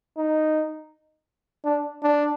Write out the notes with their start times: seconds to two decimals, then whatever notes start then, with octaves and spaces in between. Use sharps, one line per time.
0.17 D#4
1.65 D4
2.03 D4